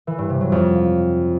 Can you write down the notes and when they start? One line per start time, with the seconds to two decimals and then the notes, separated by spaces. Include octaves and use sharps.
0.07 E3
0.18 G2
0.30 C3
0.41 F#3
0.52 F2